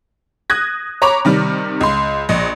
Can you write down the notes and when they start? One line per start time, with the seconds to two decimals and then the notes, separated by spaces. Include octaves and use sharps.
0.50 D#6 F#6 G#6 A#6
1.02 C#5 A#5 B5 C#6 D6 F7
1.25 C3 D#3 G3
1.81 C#2 C6
2.29 A#1 D#5